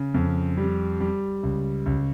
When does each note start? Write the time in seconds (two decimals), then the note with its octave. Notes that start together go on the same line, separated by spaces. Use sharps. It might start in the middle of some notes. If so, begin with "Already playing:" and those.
Already playing: C#3
0.14 F2
0.57 G3
1.00 G3
1.43 C#2
1.86 C#2